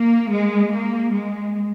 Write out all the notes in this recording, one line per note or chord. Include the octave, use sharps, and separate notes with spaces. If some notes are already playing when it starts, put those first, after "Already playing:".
Already playing: A#3
G#3
A#3
G#3